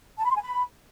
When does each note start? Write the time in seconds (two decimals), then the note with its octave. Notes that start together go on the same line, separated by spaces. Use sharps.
0.18 A5
0.24 B5
0.30 C6
0.36 G#5
0.42 B5